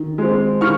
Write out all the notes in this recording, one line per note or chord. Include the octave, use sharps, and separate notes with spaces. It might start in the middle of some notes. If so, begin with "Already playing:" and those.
Already playing: D#3
G#3 C4
D#3 C#6 F6